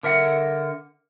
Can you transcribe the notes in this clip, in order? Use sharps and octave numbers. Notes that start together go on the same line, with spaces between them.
D3 A#4 E5 F#5